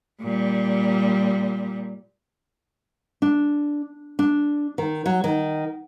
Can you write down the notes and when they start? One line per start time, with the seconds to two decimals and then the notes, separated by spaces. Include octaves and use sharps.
0.21 A#2 G3
3.22 D4
4.19 D4
4.78 D#3
5.06 F#3
5.24 D#3